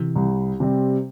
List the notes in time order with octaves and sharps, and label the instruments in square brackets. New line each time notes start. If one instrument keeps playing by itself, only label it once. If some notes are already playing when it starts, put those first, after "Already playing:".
Already playing: [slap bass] C3 E3
[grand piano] C2
C3 G3 C4